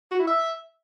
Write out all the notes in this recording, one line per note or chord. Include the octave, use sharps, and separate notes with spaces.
F#4
E4
E5